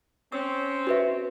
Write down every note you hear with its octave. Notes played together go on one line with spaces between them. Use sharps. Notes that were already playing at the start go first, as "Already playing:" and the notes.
C4 C#4 E6
F#4 B4 E5